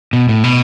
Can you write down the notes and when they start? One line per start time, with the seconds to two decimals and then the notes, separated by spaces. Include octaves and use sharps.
0.13 B2
0.29 A2
0.44 B2